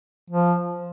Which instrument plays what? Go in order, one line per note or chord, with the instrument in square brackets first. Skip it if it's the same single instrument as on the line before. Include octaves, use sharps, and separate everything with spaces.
[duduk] F3